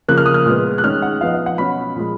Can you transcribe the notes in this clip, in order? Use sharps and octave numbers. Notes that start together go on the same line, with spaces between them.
C#3 F3 A#3 F#6
F6
D#6
F6
A#2 G#3 B3
F#6
D#3 G#3 C#4 F6
F#5
F3 B3 D#4 F5
F5
F#5
B2 F#3 C#4 B5
A#2 F3 G#3